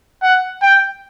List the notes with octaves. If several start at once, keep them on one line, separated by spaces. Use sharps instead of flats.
F#5
G5